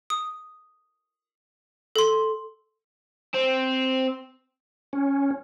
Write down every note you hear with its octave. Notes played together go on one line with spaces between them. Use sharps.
D#6
A4 C6
C4
C#4